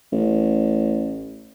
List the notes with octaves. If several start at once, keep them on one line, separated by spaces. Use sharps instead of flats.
A1